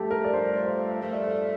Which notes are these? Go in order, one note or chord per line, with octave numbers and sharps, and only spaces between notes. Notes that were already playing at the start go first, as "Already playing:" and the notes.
Already playing: G2 F3 A3 F4 G4 A4
A#4
D5
G2 F3 A3 C5
C5
G2 F3 A3 C5
D5
C5